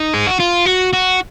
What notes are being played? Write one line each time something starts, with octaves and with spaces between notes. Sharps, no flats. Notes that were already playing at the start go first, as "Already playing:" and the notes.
Already playing: D#4
G#4
F#4
F4
F#4
F#4